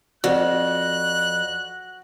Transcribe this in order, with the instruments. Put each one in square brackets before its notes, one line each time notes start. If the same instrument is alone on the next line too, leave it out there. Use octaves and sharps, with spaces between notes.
[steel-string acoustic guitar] F2 [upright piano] F#4 [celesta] D5 [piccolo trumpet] F#6